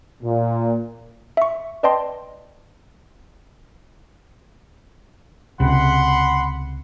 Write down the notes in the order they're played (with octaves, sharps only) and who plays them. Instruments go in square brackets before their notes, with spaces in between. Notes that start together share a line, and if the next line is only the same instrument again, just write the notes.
[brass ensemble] A#2
[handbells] E5 C#6
B4 D5 D#5 G5 A5 C6
[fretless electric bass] C#2 C3 [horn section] F#5 B5 C6